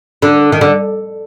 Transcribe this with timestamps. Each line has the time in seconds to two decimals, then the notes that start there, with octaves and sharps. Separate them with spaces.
0.22 D3
0.52 D#3
0.61 D3